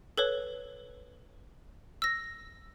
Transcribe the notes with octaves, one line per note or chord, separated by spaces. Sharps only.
A4 B4 C#5
E6 A#6